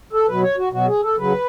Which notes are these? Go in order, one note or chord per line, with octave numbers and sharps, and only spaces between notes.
A4
B2 F#3 B4
C#5
F#4
B2 F#3 F#4
G#4
A4
C#3 F#3 B4